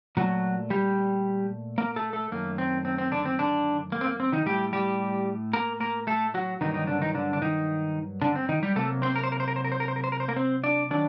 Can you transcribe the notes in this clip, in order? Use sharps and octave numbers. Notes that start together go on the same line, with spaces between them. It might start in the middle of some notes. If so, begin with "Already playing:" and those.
A#2 F#3 A3 F#4
G3 G4
A#3 A#4
A3 A4
A3 A4
F#2 D#3 A3 A#3
C4
C4
C4
D3 D4
C4
D3 D4
A#3
C4
A#3
C4
D#3 D#4
A2 G3 A3 G4
G3 G4
A#3 A#4
A#3 A#4
A3 A4
F#3 F#4
G2 D#3 F#3 A#3 D#4
D#3 D#4
D3 D4
D#3 D#4
D3 D4
D4
D#3 D#4
D3 D4
C4
D#3 D#4
G3 G4
C3 F#3 A3 A#3 A4
C4 C5
A#4
C5
A#4
C5
A#4
C5
A#4
C5
A#4
C5
A#4
C5
A#4
C5
A#3 A#4
C4 C5
D4 D5
D#3 F#3 D4 D5